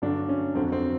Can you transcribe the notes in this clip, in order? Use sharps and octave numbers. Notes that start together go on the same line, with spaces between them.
G2 D3 F#3 D4
C#4
F2 D3 F#3 C4
C4